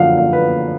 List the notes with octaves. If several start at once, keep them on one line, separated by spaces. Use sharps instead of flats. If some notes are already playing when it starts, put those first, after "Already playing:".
Already playing: F#2 D3 F3 F5 F#5
F5
B4